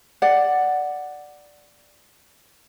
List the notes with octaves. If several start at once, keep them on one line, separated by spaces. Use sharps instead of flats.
D5 F#5